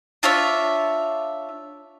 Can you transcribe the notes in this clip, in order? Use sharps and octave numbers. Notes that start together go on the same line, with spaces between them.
D4 F4 C#5 E5